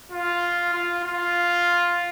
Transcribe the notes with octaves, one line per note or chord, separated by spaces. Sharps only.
F4
F4
F4